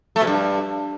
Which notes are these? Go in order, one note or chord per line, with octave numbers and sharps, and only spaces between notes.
A3
B2
G2